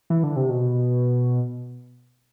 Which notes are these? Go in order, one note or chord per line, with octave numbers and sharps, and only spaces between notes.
E3
D3
C3
B2